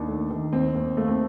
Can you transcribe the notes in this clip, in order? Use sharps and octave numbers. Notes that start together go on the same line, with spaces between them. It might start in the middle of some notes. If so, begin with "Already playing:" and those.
Already playing: D#2 D4 D#4
A3
D#3
D#2 C4
D#2
A3 A#3
C4